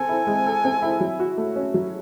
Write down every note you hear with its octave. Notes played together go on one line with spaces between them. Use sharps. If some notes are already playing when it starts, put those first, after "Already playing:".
Already playing: C4 A4 G#5
E4
G#3
A4
C4
E4
F#3
F#4
A3
C#4
F#3